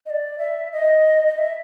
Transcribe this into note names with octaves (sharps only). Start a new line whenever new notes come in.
D#5
D5
E5
D#5
D#5
E5